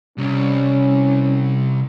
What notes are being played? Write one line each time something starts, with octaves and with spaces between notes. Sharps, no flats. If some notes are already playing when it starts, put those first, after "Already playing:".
C2 C#4